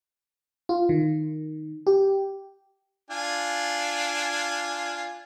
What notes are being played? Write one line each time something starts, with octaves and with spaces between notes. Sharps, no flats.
F4
D#3
G4
D4 F4 G#5